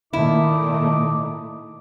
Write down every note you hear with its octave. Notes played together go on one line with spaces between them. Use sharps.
A#2 D#3 A3 D#4 E4 D#5 D6